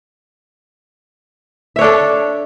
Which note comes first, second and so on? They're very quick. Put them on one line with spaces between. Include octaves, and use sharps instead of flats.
E5 C#5 D4 A4